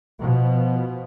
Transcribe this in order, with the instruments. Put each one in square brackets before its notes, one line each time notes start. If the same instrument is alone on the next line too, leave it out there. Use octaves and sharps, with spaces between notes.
[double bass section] B2 F3